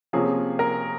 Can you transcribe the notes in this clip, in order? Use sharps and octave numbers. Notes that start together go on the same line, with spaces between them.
C3 F3 A#3 C#4 G#4
A#4